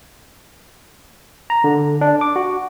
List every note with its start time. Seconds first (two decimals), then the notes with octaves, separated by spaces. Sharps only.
1.50 A#5
1.64 D3
2.01 D4
2.21 D6
2.36 F#4